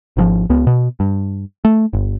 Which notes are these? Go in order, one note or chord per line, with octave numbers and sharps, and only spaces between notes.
G#1 C3 F3
C#2 B3
B2
G2
A3
G1